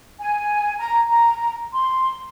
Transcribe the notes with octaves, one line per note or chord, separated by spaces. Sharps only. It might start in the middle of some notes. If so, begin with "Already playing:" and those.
G#5
A#5
A#5
C6